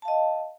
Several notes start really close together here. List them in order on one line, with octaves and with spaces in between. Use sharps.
A5 F5 D#5